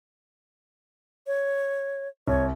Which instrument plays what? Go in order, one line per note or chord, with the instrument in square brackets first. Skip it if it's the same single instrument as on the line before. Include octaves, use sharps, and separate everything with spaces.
[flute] C#5
[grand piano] C2 [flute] C#5